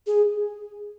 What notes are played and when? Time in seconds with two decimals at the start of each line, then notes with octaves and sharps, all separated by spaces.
0.07 G#4